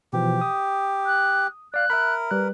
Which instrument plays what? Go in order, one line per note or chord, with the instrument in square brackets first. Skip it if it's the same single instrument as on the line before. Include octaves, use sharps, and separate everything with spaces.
[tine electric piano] B2 E3 F3 [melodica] G4
[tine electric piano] D#6
[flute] F#6
[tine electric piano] D5 F5 [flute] F#6
[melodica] A#4 [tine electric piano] E5 B5
[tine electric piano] G3 F#6 [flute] B4